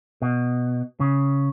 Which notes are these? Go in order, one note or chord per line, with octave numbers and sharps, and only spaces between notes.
B2
C#3